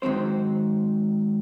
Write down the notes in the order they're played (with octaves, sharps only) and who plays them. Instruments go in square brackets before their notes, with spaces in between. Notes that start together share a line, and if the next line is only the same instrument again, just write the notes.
[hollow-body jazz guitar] G#2 D#3 F#3 C4 C5